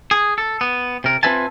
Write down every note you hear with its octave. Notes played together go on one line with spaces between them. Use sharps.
G#4
A4
B3
C3 A#4
C4 F4 B4 E5 G#5 A5